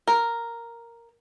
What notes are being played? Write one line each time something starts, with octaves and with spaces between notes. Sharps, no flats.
A#4